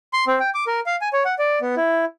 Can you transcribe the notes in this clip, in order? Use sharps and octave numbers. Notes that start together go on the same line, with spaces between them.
C6
C4
G5
D6
A#4
F5
G#5
C#5
F#5
D5
B3
E4